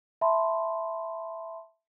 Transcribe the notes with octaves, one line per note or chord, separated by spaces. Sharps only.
E5 A5 B5 C6